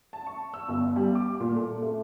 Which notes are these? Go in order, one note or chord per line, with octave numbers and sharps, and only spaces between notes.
A5
C#6
E6
G1
G3
D6
A#2
A4
A3